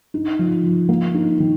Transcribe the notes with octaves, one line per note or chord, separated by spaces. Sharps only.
D#4
F3
F3
A#3
D#4
D#3